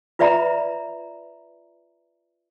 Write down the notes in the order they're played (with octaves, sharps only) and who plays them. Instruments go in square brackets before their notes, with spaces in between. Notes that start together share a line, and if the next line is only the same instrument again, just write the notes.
[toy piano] F4 B4 D5 E5 A#5 B5